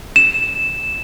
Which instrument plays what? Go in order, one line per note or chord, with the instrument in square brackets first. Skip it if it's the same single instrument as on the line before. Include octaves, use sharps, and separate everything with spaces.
[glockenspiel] E7